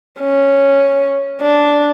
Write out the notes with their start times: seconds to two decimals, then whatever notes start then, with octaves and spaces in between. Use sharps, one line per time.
0.21 C#4
1.42 D4